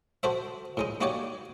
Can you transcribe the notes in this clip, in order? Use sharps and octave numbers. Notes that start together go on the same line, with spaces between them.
F#4 A4 C5 E5
A2 G#3 D#4
A#3 D#4 F#4 G4 C#5 D5